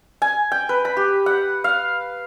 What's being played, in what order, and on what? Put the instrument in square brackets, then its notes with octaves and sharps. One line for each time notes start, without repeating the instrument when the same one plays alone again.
[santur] G#5
G5
B4
B5
G4
F#5
F5